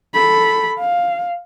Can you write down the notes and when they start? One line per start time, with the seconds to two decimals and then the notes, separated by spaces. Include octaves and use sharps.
0.14 A4 B5
0.79 F5